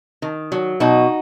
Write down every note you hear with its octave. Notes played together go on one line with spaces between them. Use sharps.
D#3
F#3
B2 D#4 F#4